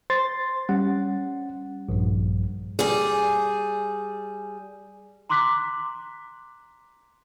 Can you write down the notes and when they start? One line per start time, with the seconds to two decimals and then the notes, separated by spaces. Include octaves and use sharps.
0.10 C5 C6 A6
0.69 G3 C#4 F#5
1.89 A#1 G2
2.79 G3 G#4
5.30 A#5 C6 D6 F#6 B6